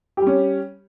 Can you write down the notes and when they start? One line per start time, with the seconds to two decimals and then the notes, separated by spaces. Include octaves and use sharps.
0.17 G4
0.22 G3
0.27 C#4